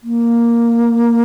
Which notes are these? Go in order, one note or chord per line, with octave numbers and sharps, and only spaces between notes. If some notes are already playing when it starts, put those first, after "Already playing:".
A#3